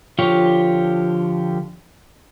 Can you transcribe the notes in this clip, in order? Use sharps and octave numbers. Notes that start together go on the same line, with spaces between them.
D3 F3 F4 G4 C#5